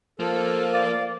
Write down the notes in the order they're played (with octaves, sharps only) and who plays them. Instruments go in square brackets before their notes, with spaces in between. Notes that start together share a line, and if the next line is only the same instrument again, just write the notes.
[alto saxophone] F3 [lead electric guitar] A#3 [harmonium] A4
[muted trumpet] D5 [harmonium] F5